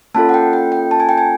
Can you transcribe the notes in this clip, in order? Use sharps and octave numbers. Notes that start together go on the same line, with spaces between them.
A#3 C#4 F4 A4 A5
F#5
G5
G5
G5
A5
G#5
G5
G#5